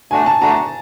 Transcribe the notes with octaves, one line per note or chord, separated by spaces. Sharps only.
A3 D4 F#4 G#5
A5
A3 D4 F#4 A#5